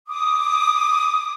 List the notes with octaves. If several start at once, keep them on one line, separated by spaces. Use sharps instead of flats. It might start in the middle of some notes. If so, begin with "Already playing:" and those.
D6 D#6